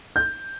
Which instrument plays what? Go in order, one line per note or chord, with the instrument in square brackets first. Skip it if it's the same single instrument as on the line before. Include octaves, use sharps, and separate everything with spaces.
[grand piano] G6